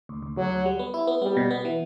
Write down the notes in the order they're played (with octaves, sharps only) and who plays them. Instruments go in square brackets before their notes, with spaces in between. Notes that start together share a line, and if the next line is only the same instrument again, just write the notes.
[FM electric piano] D2
D2
[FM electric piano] D2 [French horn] F#3
[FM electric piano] D2
G3
B3
E4
B3
[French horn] G3 [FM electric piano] B3
[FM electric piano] B2
B3
E3